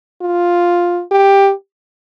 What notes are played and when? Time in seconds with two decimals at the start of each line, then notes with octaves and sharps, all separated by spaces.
0.21 F4
1.11 G4